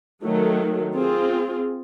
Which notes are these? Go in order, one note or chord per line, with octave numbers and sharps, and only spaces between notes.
D#3 F#3 A3
C4 F4 G#4